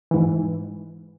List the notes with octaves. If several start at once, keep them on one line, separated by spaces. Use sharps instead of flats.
G#2 E3